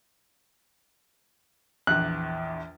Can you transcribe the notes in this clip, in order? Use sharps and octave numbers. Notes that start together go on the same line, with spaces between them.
A#1 E2 F#6